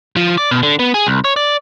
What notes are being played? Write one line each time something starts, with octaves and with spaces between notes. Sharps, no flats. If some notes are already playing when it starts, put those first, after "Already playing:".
F3
D5
B2
D3
B3
G#4
C2
C#5
D5